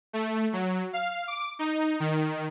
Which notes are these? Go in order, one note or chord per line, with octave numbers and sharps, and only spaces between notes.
A3
F#3
F5
D6
D#4
D#3